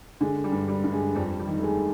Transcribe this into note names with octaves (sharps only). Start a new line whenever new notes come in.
D3 G#3
G3
G2
G3
G2
G#3
F2 G3
G3
D#3
A3
G#3